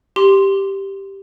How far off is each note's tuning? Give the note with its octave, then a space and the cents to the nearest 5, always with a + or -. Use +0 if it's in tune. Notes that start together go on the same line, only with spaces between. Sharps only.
G4 +0 C6 +0